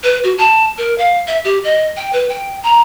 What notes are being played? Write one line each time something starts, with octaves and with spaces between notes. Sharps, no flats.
B4
F#4
A5
A#4
F5
E5
G4
D#5
G5
B4
G5
A#5